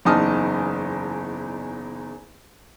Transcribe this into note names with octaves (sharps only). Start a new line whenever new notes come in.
F#1 E2 D#4 A5 D#6 F6